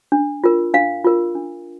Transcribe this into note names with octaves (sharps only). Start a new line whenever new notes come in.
D4
F4 A#4
D4 F5
F4 A#4
D4